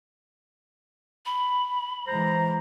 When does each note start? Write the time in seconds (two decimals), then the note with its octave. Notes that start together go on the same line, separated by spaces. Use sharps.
1.26 B5
2.08 E3 G#3 C5 A#5